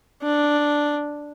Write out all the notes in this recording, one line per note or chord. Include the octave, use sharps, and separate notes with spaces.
D4